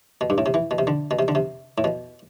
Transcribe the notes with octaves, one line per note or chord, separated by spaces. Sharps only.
B2
G2
A2
C3
E3
B2
C3
D3
B2
C3
D3
C3
A2
B2